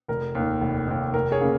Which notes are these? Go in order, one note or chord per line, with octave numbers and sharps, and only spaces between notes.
F1 A#4
D#2 D#3
F1
D#2 D#3
F1 A#4
G#4 C#5
C#3 A#3